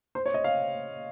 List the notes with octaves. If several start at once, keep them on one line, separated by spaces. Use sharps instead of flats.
C5
C#5
D#5
F5